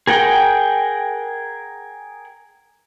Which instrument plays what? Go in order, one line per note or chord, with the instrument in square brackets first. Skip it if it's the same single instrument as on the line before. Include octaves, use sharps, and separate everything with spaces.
[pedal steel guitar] G#4 A#4 F#5 G5